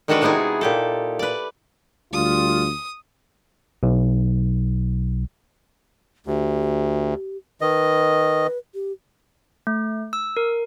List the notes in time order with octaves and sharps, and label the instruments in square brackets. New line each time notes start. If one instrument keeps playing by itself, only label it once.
[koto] D#3 G#3 D4 F#4 A4 B4
C3 G#3 B3 D#4 E4 G#4
A#2 G4 A4
B4 D5
[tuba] D2 [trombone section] G3 F4 [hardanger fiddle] D#6
[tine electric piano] B1
[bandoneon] D2 [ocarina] G4
[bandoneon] D#3 D#5 [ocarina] B4
[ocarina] G4
[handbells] A3
E6
A#4